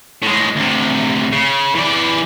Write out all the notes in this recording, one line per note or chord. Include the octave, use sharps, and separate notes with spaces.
A2 G#3
D2 C3
C#3
E3 D5